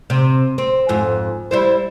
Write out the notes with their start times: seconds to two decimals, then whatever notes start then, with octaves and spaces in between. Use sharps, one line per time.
0.10 C3
0.58 C4
0.89 F2 G#2
1.51 G3 E4 C5